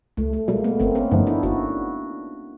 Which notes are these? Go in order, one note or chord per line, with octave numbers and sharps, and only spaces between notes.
C#2 A3
A3
B2 G3 G#3 A#3
A3 B3
G1 A#3 C4
B3 C#4
G2 D3 F3 A3 C#4 D#4
D4 E4
G1 E4 F#4